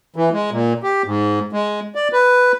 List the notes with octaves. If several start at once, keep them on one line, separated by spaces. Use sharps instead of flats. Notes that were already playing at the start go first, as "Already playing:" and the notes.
E3
G#3
A#2
G4
G#2
G#3
D5
B4